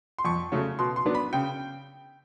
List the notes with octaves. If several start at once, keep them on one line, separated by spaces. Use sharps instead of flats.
C6
F2 C#6
C#3 F#3 A3 C#4
B2 C6
C6
F#3 B3 D4
B5
C#3 G5